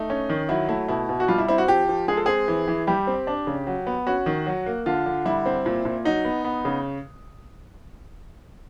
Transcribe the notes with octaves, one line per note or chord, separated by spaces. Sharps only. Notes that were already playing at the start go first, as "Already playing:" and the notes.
Already playing: A3 D#4
C#4
D#3
F#3 E4
A3 E4
B2 E4
B2
F#4
G3 F4
E4
C4 E4
F#4
F3 G4
F3
G#3 G#4
A4
C4 G#4
E3
E3
G3 G4
C4
D4
C#3
F#3
B3
C#4 F#4
D#3
F#3
A#3
D3 F4
D3
G3 E4
C4
A#2
A#2
F#3 D#4
B3
B3
C#3